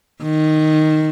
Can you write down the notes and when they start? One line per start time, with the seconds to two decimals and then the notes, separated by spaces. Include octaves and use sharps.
0.22 D#3